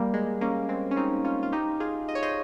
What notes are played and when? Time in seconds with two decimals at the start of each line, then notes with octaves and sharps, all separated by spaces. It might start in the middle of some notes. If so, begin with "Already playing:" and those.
Already playing: G3 A#3
0.14 G#3
0.41 A#3 C#4
0.69 G#3 C4
0.91 C#4
0.96 C4 D#4
1.24 C#4 F4
1.43 F4
1.52 D#4 G4
1.80 F4 G#4
2.08 D#5
2.15 C#5
2.22 C5 D#5